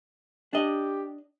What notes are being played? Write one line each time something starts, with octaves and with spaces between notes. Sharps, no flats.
D4 G4 D#5